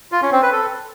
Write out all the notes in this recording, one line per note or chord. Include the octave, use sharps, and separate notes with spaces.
F4
C#4
C4
B4
A4